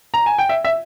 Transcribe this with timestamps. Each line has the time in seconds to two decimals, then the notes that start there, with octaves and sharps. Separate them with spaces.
0.14 A#5
0.26 G#5
0.39 G5
0.49 E5
0.64 E5